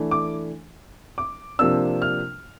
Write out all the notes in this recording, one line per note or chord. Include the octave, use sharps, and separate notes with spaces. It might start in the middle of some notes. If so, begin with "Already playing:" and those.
Already playing: E3 A3 D4
D6
D6
C3 F3 A#3 D4 E6
F6